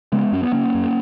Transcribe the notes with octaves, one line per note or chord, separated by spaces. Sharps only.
C#3 G#3 B3
F#2 C#4
B3
C#3 A#3 C#4
F#2